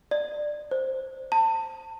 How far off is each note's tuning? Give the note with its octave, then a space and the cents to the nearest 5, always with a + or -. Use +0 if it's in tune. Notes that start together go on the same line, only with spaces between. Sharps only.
D5 +20
C5 +5
A5 +30